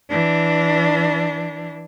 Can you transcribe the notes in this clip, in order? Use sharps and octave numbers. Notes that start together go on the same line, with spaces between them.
E3 D4